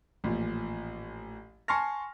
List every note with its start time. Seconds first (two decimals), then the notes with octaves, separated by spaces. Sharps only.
0.24 A1 A#2 F3
1.68 G#5 A5 C6 C#6 F6 A#6